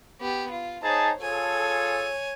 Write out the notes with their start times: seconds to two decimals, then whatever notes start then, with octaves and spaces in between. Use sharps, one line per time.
0.21 B3 G4
0.50 F4
0.83 D#4 G#4 C5 C#5 A5
1.20 F4 G#4 A4 C#5 G#5